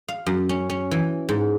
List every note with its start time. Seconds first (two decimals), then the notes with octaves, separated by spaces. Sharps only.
0.08 F5
0.26 F#2
0.49 C#4
0.70 C#4
0.91 E3
1.29 G#2